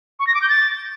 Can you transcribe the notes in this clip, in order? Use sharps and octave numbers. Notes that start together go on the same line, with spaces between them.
C#6
A#6
D6
G6
A6